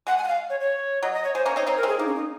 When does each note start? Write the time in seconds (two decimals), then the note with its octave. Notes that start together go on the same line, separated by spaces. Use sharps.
0.07 G#3 F#5
0.18 G#5
0.24 F#5
0.28 F5
0.50 C#5
0.60 C#5
1.03 F#3 D#5
1.13 D#5
1.24 C#5
1.35 G#3 C5
1.45 A#3 C#4 C#5
1.56 C4 D#4 C#5
1.67 C4 D#4 C#5
1.77 A#4
1.83 G#3 C4 G#4
1.99 A#3 D#4
2.07 C#4
2.15 D#4